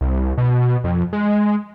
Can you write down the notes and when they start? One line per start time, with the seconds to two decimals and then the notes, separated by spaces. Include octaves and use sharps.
0.01 C2
0.38 B2
0.84 F2
1.13 G#3